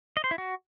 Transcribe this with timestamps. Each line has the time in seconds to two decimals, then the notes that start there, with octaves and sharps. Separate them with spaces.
0.17 D#5
0.24 C5
0.31 E4
0.38 F#4